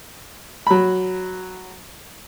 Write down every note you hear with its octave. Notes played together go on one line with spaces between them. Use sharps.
F#3 B5